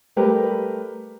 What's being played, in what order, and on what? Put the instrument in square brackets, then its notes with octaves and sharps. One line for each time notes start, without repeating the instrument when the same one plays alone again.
[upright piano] G3 A3 G4 A#4 B4